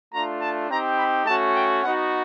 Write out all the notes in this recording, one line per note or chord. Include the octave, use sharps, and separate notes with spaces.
A3 D4 F4 A#5
A5
C4 D#4 G4 A#5
B5
A3 C#4 F#4 A5
G5
B3 D#4 F#4 F#5